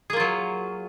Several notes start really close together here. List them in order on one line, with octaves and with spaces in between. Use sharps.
G#4 A#3 F4 F#3